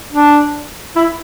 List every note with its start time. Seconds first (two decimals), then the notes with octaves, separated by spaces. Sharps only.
0.13 D4
0.96 E4